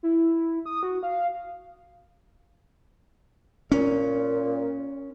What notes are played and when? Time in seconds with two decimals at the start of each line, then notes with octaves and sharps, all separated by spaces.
0.03 E4
0.66 D#6
0.83 F#4
1.03 F5
3.72 A#2 C#4